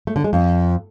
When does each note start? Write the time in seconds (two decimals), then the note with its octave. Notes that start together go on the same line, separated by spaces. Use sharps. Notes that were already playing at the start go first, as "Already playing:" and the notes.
0.07 A3
0.16 D3
0.24 G#3
0.33 F2